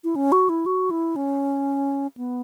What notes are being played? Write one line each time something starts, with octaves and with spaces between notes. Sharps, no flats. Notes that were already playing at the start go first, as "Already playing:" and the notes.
E4
C#4
F#4
E4
F#4
E4
C#4
B3